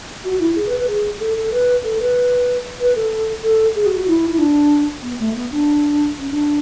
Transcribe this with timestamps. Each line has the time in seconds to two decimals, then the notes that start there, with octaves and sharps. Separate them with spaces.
0.25 F#4
0.40 E4
0.56 G#4
0.67 B4
0.77 B4
0.88 G#4
1.20 A4
1.35 A4
1.51 B4
1.84 A4
2.00 B4
2.80 B4
2.95 A4
3.43 A4
3.75 G#4
3.86 F#4
3.97 F#4
4.07 E4
4.30 E4
4.38 D4
5.03 B3
5.19 A3
5.34 B3
5.51 D4
6.19 C#4
6.30 D4